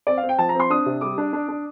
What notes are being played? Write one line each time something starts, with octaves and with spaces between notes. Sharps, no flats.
C4 D5
F5
C4
G5
F3 A5
A#5
C4
C6
D4 D#6
C3
G3 D6
D4
D4
D4